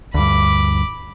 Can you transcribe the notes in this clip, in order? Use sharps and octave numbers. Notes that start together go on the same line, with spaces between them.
D2 G2 B5 D6